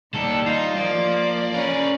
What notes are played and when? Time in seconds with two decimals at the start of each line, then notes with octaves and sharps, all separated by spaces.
0.14 D#3 G3 A#3 A4
0.46 D#4 F4
0.76 F3 A#3 D5
1.54 C#4 A#4 B4